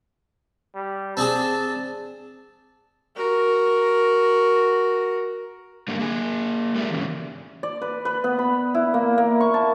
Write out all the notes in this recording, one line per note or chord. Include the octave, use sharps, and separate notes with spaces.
G3
C4 D4 G#4 A5
F#4 A#4
G#2 D3 G3 A3 A#3
A#3 G#4 G#5
G#3 G4 A4 A#4 D5 E5
G#2 C#3 E3
D5
B4
B4
B3
B5
E4
A#3
A#3
C#6
A5